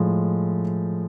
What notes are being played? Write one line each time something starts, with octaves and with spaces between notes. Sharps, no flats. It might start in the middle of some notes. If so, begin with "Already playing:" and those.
Already playing: A2 F3 G#3